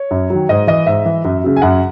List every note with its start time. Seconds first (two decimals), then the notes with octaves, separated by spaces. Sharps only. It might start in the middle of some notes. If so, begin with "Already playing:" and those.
Already playing: C#5
0.11 F#2
0.30 D#3 F#3
0.49 G#2 D#5
0.67 E3 D#5
0.87 G#2 E5
1.05 E3
1.25 F#2
1.44 C#3 F#3
1.56 G#5
1.62 F#2 F#5